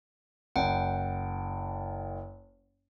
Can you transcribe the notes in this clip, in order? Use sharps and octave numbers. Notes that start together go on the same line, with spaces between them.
F#1 F#5 G5